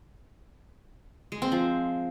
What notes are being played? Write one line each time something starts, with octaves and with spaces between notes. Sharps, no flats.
G#3
C4
F3